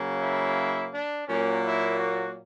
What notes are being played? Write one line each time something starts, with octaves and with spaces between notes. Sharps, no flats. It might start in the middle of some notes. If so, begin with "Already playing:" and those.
Already playing: C#3 F#3 A#3
E4
D4
A#2 F#3 A#3 C#4
E4
F#4